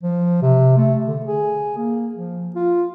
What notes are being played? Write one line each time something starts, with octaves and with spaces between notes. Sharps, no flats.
F3
C3
A3
D3
G#4
A#3
F3
F4